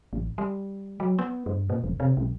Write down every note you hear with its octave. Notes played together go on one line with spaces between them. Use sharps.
A1
G3
F#3
B3
G2
A#2
E1
C3
B1